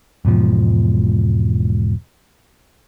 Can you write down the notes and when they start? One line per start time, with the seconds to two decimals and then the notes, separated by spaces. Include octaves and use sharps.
0.25 E1 G#2 B2 F3